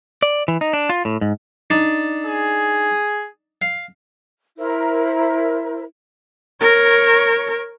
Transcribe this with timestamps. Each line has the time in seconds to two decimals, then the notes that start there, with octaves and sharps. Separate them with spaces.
0.22 D5
0.48 E3
0.61 D#4
0.73 D4
0.89 F4
1.05 A2
1.21 G#2
1.70 D4 D#4 D5
2.26 G#4
3.62 F5
4.58 E4 A#4 C5
6.60 A#4 C#5